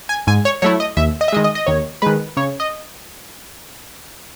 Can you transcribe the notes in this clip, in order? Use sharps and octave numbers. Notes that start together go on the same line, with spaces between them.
G#5
G#2 G#5
C#5
F#3 A3 E4 C#5
D#5
D#2 E5
D#5
E5
D#3 G#3 D#5
D#5
D#5
D#2 C#5
D#3 G#3 B4
C#3 C#5
D#5